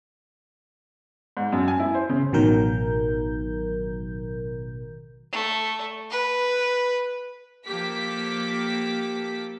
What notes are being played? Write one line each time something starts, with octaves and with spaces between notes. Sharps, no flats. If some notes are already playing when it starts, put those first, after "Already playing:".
G#2
F#2
G#5
E4
C5
C#3
A1 B2 D#3 F#3 A#4 G6
A3
B4
F3 A#3 G4 A4 D6 B6